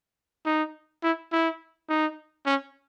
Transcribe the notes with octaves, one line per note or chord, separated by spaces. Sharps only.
D#4
E4
E4
D#4
C#4